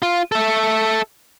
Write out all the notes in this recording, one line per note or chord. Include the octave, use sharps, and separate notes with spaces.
F4
A4 E5